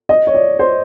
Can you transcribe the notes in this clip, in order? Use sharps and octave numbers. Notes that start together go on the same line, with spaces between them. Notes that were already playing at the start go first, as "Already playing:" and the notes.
D#5
C#5
D5
C5